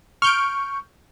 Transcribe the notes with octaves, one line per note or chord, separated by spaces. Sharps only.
C#6 F6 G6 D7